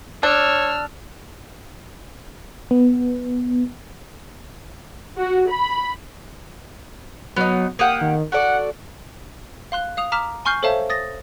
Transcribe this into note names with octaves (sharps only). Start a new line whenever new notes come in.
D4 C#5 E6 F6
B3
F#4
B5
F#3 B3 C#4 D#4
A#3 G4 F#5 D#6
D#3
F#4 A4 D5 F#5
F5 C6 F#6
F5 D#6 F7
A#5 D6 F6 B6 E7
G#5 C6 C#6 F6 G6 C7
A4 C5 C#5 E5 F5 A5
D#6 A6 A#6